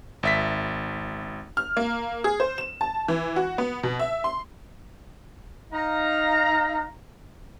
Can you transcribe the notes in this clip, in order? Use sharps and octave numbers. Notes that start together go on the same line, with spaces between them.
G#1 E5 B6
F6
A#3
G#4
C5
E7
A5
E3
F#4
B3
B2
E5
C6
D#4 F5 A#5